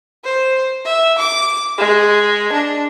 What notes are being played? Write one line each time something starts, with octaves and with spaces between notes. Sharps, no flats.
C5
E5
D6
G#3
D4